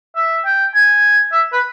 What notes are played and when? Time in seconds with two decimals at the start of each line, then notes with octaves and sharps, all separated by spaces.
0.16 E5
0.45 G5
0.74 G#5
1.32 E5
1.53 B4